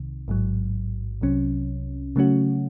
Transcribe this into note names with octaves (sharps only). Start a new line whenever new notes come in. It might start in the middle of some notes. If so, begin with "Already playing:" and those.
Already playing: C2 C3 D#3
A1 G#2 F#3
C2 C3 F#3 C#4
C#3 F#3 A3 C#4 F#4